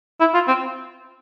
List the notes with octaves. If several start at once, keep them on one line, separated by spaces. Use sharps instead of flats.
E4
F4
C4